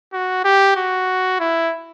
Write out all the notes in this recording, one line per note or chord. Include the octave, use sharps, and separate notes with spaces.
F#4
G4
F#4
E4